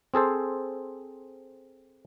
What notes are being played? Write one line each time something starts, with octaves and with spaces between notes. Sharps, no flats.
C4 G#4 A4 C5